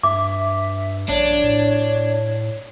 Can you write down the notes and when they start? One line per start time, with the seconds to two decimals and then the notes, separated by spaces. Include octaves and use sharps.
0.03 G2 E5 D6
1.09 A#1 D4 C#5
1.44 A2